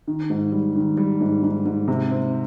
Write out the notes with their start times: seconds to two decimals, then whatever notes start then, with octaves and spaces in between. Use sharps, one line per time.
0.07 D#3
0.30 G#2
0.52 G3
0.75 D#3
0.97 G3
1.21 G#2
1.43 G#2
1.65 G#2
1.88 C3
2.11 C4